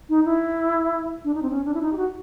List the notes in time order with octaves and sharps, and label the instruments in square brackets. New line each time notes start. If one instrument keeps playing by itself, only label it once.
[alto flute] D#4
E4
D4
D#4
C4
C#4
D4
E4
D#4
G4
F#4